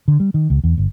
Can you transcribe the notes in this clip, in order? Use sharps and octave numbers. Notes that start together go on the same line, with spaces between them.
D3
G3
D#3
C#2
E2
G1